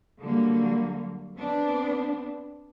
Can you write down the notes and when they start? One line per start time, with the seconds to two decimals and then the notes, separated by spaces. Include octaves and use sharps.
0.21 D3 F#3 G3 A#3
1.36 B3 C4 D4